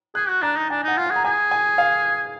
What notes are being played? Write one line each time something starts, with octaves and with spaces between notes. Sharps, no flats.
G#4 F#6
F#4
D4 A#5
D#4
D4 G#5
D#4 F#5
F4
G#4 F#5
A#5
G#4 G#5
G#5
F5